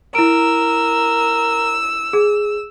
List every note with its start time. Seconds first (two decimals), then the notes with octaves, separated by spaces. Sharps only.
0.15 E4 A#4 E6 D7
2.13 G#4